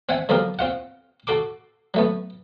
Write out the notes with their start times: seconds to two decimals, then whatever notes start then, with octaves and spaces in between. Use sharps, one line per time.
0.09 C4 E5 F#5 G#5
0.29 D3 F3 F#3 B3 G4 A#4
0.59 C4 F4 F#5
1.27 F#4 A4 C6 D6
1.94 F#3 A3 B3